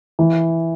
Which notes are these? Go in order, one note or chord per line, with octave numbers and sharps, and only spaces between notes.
E3